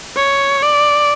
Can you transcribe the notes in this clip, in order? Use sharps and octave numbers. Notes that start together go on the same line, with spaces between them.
C#5
D5